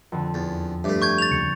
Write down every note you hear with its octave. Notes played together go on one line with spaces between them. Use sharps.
F2 D3
E2 A6
G2 A3 D5 E5
C#6 G6 G#6
A6 F7
D#2 C#3 C#7